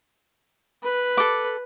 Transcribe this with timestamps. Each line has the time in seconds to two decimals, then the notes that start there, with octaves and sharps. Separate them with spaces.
0.83 B4
1.17 A4 D6